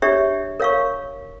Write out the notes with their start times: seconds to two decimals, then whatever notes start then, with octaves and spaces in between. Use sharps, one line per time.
0.02 D4 G4 C#5 E5
0.60 A#4 C#5 F5 C#6